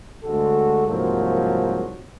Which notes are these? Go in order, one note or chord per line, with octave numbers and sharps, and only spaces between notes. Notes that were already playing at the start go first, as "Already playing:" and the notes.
D2 G#3 F#4 A4
C2 G#2 F3 F#3 A#3